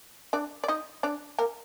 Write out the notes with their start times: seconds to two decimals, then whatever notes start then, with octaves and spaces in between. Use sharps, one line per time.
0.33 D4 D5
0.64 D5
0.68 D#4 D#5
1.03 D4 D5
1.38 A#3 A#4